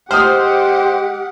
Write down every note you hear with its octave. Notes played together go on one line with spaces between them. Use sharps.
G#3 G4 C5 D#5 F#5 G5 D#6 F6